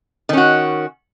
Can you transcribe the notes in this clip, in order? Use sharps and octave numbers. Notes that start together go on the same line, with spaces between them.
D#3 C#4 F#4